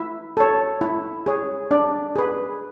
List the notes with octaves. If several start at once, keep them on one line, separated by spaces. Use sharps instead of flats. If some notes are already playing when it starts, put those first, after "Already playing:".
Already playing: E4 E5
A4 C#5
E4
G#4 C#5
D4 D5
G#4 B4